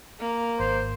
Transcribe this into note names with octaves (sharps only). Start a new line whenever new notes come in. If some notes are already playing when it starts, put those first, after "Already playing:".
A#3
G#1 C5